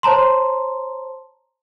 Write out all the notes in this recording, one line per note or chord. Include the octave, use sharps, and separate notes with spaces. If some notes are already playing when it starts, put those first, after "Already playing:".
C5 C#5 A5 A#5 C6